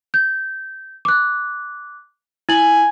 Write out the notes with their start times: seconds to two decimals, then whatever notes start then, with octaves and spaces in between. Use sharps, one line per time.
0.14 G6
1.05 D6 F#6
2.49 E4 G#5 F#7